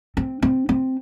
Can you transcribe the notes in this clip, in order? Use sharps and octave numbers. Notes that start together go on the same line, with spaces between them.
C4
C4
C4